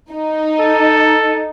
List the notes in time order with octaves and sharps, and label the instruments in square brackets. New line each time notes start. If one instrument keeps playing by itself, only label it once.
[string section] D#4
[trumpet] A4